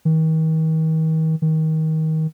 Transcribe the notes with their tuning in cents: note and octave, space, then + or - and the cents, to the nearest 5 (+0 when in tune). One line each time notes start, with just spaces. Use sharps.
D#3 +40
D#3 +25